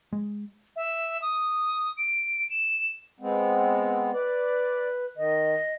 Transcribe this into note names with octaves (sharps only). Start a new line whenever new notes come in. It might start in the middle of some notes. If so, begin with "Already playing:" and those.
G#3
E5
D#6
D7
E7
G#3 B3 C4
B4 D5
D#3 D#5